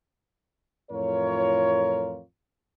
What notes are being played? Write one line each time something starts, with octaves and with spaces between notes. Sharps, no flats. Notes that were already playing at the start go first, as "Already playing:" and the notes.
F2 A2 E3 F4 A#4 C#5